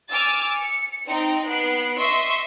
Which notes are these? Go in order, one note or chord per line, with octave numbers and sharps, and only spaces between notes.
G#5 D6 E6 F6 A6
C#7
C4 D#4 G5 A#5
B3 F#6 C7 D7
D#5 E5 C6 C#6 E6 C7